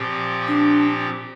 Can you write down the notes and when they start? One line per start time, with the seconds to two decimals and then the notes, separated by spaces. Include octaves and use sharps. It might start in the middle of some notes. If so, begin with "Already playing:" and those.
Already playing: A#2 F3 C4 G4
0.47 D4